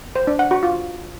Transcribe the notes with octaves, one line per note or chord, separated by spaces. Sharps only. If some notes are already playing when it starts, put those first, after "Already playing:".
C5
D4
F#5
F#4
F4